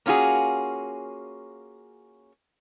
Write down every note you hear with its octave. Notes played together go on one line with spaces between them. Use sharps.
A#3 C#4 F4 F#4 G#4